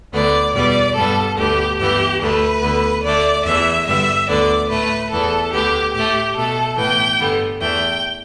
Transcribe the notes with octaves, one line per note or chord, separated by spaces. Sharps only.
D2 D3 B3 D5
E2 B2 G3 B3 D5
G2 G3 B3 A4
D2 D3 B3 G4
G2 E3 B3 G4
D2 D3 A3 B4
D2 D3 B3
D2 D3 A3 D5
E2 E3 A3 E5
G2 D3 G3 B3 E5
D2 D3 B3 D5
A2 A3 B4
E2 E3 B3 A4
D2 D3 B3 G4
A2 A3 G4
B2 A3 A4
A2 E3 B3 G5
G2 D3 G3 B3
E2 E3 A3 G5